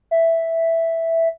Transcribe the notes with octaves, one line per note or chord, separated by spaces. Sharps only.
E5